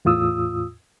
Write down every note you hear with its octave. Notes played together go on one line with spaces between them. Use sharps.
E2 A2 F4 D#6 E6